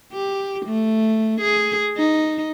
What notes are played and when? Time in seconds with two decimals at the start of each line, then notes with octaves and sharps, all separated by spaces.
0.13 G4
0.66 A3
1.41 G#4
1.97 D#4